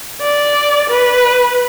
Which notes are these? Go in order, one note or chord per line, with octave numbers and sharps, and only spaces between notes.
D5
B4